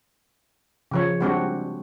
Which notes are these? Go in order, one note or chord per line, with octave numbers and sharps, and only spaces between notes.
C#3 F3 C#5
G3 G#3 C4 D4 F#4